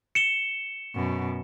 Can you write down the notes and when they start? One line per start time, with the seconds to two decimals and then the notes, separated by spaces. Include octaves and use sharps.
0.15 C#7 E7 G7
0.95 F#2 B2